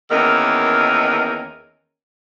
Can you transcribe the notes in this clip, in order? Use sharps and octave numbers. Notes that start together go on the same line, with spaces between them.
E2 D#3 A#3 C#4 A#4